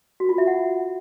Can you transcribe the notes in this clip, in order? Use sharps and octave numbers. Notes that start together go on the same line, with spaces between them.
F#4
F4
E5
F#5